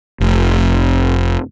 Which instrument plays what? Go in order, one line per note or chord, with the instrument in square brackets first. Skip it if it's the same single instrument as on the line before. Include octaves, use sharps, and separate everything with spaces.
[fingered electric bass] F1